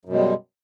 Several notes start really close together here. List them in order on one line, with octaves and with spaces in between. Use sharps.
F#2 B2 G#3 G3